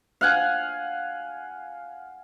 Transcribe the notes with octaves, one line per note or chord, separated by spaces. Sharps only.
F5 F#5 G#5